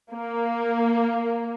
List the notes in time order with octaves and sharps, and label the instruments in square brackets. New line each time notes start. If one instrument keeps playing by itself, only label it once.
[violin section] A#3